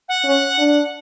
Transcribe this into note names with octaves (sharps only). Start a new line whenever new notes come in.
F#5
C#4
D4